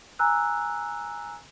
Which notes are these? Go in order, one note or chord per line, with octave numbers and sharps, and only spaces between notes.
G#5 A#5 E6 F#6